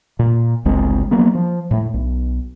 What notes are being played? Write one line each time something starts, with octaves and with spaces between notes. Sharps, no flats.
A#2
G1 C#2 G#3 C4
F3 F#3 A#3 B3
F3
A2 A3
B1